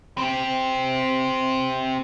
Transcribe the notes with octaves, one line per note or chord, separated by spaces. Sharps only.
C4 G4